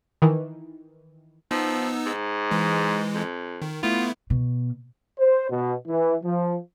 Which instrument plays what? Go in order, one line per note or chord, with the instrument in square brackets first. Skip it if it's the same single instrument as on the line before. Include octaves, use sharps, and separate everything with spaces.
[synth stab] D#3 E3
[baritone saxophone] F3 [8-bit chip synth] B3 D#4 E6
[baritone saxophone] G#2
[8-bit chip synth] E3 G#3
[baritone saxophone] F2
[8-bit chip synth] D#3
[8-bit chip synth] A3 B3 E4 [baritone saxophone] F4
[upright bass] B2
[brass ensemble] C5
B2
E3
F3